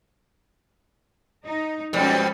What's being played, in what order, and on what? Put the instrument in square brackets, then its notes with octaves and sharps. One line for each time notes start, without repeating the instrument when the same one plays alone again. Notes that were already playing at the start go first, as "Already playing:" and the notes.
[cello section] D#4
[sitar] F2 B2 G3 [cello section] G#3 C#4